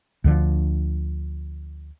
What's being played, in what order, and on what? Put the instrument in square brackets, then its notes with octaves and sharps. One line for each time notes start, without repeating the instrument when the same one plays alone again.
[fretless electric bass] D2 D3 F3